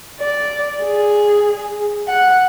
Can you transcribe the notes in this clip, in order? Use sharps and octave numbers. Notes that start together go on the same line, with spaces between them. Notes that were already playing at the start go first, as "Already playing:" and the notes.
D5
G#4
F#5